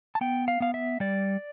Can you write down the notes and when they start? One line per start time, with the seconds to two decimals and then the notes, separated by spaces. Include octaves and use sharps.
0.15 A5
0.21 B3 G5
0.48 F5
0.60 B3 F5
0.74 E5
1.00 G3 D5